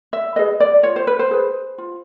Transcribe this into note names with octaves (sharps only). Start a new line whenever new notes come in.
E5
G#4 B4 D#5
D5
F4 C#5
C5
B4
C5
G#4 B4
F4